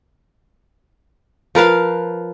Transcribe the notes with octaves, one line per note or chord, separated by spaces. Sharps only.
F3 A#4 B4 F5